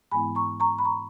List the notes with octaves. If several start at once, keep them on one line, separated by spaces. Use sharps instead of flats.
G#2 E3 G#3 B3 E4 G#5 B5
A#5 C#6
A#5 C#6
B5
A#5 C#6